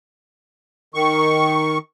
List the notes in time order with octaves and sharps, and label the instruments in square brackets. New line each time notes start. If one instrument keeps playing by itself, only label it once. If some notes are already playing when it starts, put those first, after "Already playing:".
[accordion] D#3 C#6